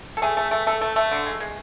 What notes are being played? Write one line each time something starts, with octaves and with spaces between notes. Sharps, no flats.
A4
A3 G#4
A3
A3
A3 A4
A3
A3
D3
G#3
G#3